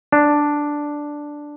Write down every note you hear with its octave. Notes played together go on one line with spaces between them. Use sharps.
D4